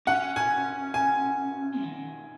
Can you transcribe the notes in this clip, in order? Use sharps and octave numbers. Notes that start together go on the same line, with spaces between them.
C#4 F#5
G#5
G#5
D#3